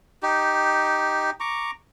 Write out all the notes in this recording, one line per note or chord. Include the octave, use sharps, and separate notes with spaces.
D#4 G4
A#5 C#6 D6